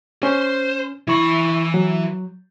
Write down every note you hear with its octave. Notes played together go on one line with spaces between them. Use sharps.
C#4 C5
E3 E4 B5 C#6
F#3